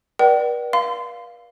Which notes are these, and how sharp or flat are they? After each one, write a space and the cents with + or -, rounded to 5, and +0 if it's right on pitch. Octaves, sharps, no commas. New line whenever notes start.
B4 -45 D5 +15 G5 -45
F5 +0 C6 -30